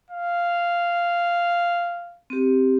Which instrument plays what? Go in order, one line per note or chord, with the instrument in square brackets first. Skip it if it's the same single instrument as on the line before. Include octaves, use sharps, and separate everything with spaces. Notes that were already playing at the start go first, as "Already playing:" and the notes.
[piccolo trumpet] F5
[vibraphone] C4 G4